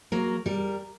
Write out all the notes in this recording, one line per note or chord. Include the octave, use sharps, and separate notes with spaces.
F#3 A#3 A#4
G3 A#4